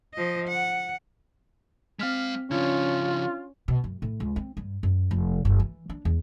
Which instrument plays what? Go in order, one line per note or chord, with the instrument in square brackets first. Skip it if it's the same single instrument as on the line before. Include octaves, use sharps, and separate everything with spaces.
[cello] F3 D#5
F#5
[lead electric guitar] G#3 F5 [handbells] C4 F6 B6
[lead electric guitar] C#3 F3 [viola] C#4 [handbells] D4 [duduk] F4
[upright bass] B2
F#2
A2
C#2
C4
G2
F#2
F1
F#1
E3
D4
E2